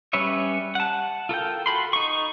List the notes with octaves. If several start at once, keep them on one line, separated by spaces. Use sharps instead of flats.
G3 C#4 B4 C#5 E5
F#5 A5
F4 A4 A#4 G5
F#4 A4 B5 C6
D#4 C#6